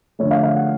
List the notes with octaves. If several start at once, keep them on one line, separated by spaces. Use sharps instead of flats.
D3 F3 A3 C#5
F5
F5
F#5